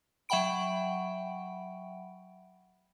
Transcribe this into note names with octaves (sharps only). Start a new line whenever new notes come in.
F#3 E5 F#5 G5 B5 D7